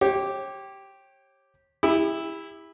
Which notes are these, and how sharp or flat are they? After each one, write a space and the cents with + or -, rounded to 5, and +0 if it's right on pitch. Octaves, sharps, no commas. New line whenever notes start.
G4 -5 C#5 -35
E4 -5 G4 +40